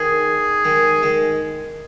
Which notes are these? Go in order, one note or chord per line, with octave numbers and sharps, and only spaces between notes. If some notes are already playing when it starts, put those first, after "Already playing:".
Already playing: D#3 G#4
D#3 G#3
D#3 G#3